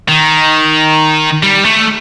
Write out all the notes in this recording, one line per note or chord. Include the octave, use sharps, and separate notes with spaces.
D#3
G3
A3